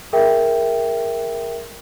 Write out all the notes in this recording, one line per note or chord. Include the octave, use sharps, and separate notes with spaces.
G#4 A#4 E5 G5